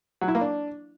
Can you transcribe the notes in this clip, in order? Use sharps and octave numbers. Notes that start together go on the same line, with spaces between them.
F#3
E4
A#3
D4